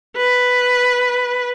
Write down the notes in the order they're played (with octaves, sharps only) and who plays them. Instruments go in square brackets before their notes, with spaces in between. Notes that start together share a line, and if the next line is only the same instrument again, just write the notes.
[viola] B4